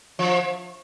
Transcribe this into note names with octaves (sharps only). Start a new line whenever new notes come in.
F3